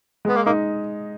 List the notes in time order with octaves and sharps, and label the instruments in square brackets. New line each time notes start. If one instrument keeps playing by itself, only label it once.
[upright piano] G#3 [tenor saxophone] B3
[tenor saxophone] A#3
[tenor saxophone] A#3 [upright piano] D#4